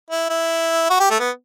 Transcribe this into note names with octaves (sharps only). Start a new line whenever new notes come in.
E4
E4
F#4
G4
A3
B3